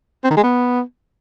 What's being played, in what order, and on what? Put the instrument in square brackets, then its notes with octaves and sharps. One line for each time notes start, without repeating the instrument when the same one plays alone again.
[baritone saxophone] C4
D#3
G#3
B3